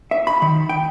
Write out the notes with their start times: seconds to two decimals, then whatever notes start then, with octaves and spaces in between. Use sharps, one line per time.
0.11 E5
0.27 B5
0.42 D#3
0.69 G5